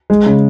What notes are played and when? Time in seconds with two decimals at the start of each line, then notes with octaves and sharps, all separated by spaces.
0.10 G#3
0.26 C#3